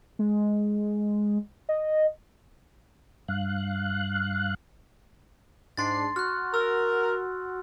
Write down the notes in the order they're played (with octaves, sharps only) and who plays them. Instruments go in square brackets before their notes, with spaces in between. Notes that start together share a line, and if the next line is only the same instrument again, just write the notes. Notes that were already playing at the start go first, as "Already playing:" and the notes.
[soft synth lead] G#3
D#5
[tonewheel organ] G2 F5 F#6
[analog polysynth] G#2 D4 C7 [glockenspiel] C6 A6
[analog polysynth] F#4 [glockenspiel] F6 F#6
[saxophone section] A#4 [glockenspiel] E6